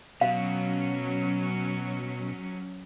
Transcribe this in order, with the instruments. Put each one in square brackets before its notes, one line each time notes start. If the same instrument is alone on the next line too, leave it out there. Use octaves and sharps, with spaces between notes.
[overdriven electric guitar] B2 [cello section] F#3 C#4 [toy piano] F5